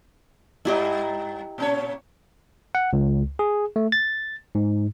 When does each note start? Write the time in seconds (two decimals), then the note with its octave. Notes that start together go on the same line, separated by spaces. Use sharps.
0.65 G2 E4 G4 D#5
1.58 A#2 C#4 C#5
2.75 F#5
2.93 C#2
3.39 G#4
3.76 A3
3.92 A6
4.55 G#2